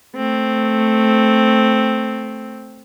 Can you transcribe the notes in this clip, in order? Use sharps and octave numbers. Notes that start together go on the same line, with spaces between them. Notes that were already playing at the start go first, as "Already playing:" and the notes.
A3 C4